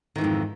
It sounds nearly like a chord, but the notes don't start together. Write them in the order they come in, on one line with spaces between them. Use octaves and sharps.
D#3 E3 G#2 F2